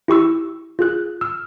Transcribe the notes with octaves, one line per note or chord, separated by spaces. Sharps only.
E4 G4 C#6 E6
F4 G#4 F#6
E6 F6